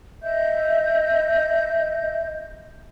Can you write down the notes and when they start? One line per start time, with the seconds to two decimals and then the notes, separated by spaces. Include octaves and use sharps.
0.22 D#5 E5 G6